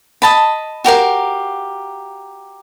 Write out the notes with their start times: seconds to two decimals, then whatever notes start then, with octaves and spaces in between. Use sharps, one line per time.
0.22 D#5 A5 B5
0.84 F#4 G4 A#4 F5